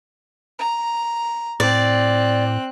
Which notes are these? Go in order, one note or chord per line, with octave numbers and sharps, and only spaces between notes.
A#5
A2 C4 D5 F#6